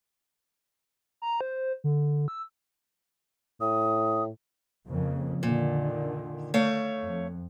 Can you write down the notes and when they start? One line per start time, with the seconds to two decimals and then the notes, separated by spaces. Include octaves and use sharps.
1.22 A#5
1.41 C5
1.84 D3
2.28 E6
3.61 A2 D#6
4.87 F2 C#3 A#3
5.43 A#2 D3 D#3
6.54 A3 C#5 F5
7.02 F2